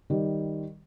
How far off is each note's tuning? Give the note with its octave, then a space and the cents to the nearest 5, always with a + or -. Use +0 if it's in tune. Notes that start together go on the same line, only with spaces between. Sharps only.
D#3 +0 G3 +0